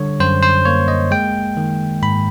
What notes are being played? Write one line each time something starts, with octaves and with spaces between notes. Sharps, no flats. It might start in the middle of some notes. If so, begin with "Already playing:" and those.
Already playing: D3 G3 C#5
F#2 C5
C5
A#3 C#5
D#5
G#3 G5
D#3
G#2 B5